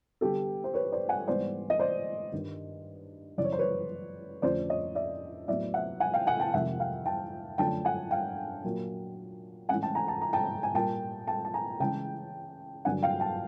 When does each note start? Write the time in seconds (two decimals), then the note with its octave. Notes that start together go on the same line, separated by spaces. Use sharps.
0.21 D3 G3 B3 G4 A4
0.64 C5
0.74 B4 C#5
0.92 C5 D5
1.09 F#5 G#5
1.27 G#2 E3 G3 B3 C5 D5
1.70 D#5
1.79 C5 D5
2.32 G2 D#3 G3
3.38 F#2 C#3 E3 D5
3.44 C#5
3.52 C5
3.59 B4 C#5
4.42 F2 D3 F3 A3 C#4 C5 D5
4.69 C#5 D#5
4.95 D5 E5
5.48 A2 F#3 B3 D5 E5
5.74 E5 F#5
6.00 F#5 G#5
6.14 F5 G5
6.27 F#5 G#5
6.40 G5 A5
6.53 F2 C3 D#3 G#3 E5 F#5
6.80 F5 G5
7.06 G5 A5
7.58 F#2 D3 F3 A3 D4 G5 A5
7.85 F#5 G#5
8.11 F5 G5
8.64 A#2 F#3 A#3
9.69 A2 E3 G#3 C#4 F#5 G#5
9.83 G5 A5
9.95 G#5 A#5
10.08 A5
10.21 A#5
10.33 G5 A5
10.63 G#5
10.74 A#2 G3 A#3 G5 A5
11.27 G5 A5
11.45 A5
11.54 G#5 A#5
11.80 C#3 E3 G#3 G5 A5
12.85 G2 D3 F#3 A#3 D4 F#5 G#5
13.03 F5 G5
13.20 G5 A5